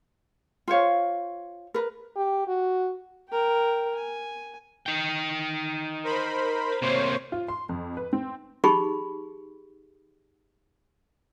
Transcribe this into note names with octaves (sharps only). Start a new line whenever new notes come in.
F4 C5 C#5 F5
A#4 B4
G4
F#4
A#4 G5
G#5
D#4 G5
A#4 C5 B5
C3 A#3 C5 C#5
F4
C6
F2
B4
C4
D#4 G4 G#4 B5 C#6